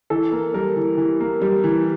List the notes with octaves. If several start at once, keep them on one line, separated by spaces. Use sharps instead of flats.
E3 A4
A#3
G3 A#4
E3
E3
A#3
G3
E3